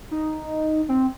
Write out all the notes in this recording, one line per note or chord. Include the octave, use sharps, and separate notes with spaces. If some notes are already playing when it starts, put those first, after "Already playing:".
D#4
C4